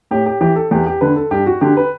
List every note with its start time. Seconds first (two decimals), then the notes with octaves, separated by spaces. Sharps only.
0.11 A2 G4
0.26 G4
0.41 E3 G4
0.56 A4
0.71 E2 G4
0.86 G4
1.01 D3 B4
1.16 A4
1.31 G2 G4
1.46 F#4
1.61 D3 G4
1.77 B4